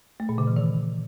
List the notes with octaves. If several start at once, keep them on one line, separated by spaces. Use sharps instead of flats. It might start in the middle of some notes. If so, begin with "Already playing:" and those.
A3
A#2
C#3
E3
D#3